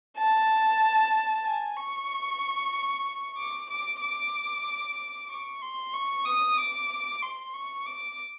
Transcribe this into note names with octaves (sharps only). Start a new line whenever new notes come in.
A5
G#5
C#6
D6
D6
D6
C#6
C6
C#6
D#6
D6
C6
C#6
D6